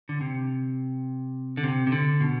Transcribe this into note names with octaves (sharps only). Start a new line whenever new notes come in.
D3
C3
D3
C3
C3
D3
B2